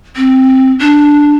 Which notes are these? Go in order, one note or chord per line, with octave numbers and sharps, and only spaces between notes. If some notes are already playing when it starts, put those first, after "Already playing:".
C4
D4